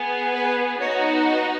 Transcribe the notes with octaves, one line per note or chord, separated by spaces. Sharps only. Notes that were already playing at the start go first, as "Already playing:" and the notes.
Already playing: B3 G#4
B4
B3 D#4 F#4 C#5